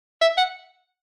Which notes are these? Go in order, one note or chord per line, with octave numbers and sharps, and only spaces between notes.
E5
F#5